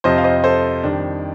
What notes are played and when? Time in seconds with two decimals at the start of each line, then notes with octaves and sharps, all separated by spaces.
0.04 F2 C3 F3 C5 D#5
0.18 F5
0.24 C5 D#5
0.44 A4 C5
0.83 F2 D#3 G3 D4